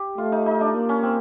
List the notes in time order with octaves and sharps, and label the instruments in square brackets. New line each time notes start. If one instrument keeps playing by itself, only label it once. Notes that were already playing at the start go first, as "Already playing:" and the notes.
Already playing: [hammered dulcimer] G4
[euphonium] A3 [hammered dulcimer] F4
[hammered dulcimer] D#4
D#4
D4
[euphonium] A#3
[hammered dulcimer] C#4
C4